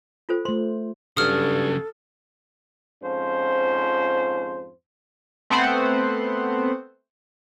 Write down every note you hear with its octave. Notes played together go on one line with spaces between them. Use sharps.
F4 A4 C5
A3 C5 C6
G2 C#3 F#3 A4 D#6 F6
F2 G#2 F3 C#4 C5
A3 B3 C4 C5 F#5